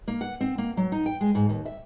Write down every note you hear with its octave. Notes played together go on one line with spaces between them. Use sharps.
A#3
F#5
C4
A#3
F#3
D#4
G5
G#3
G#2
D#2
E5